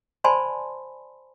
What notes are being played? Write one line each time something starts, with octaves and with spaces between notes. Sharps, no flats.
C5 D5 G#5 A5 B5 C6